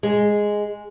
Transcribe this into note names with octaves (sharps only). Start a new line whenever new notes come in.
G#3